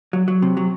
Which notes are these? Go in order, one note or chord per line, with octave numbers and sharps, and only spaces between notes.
F#3
F#3
C3
F#3